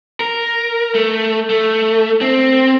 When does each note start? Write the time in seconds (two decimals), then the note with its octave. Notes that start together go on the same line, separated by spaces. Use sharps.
0.20 A#4
0.94 A3
1.50 A3
2.21 C4